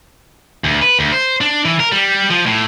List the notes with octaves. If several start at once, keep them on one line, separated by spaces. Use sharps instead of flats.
D2
B4
D2
C5
D4
E3
A#4
G3
F3
A2